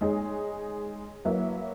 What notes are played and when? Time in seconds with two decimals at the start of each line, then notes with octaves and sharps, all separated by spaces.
0.01 G#3 D#4 G#4 C#5
1.25 F#3 A#3 E4 B4 E5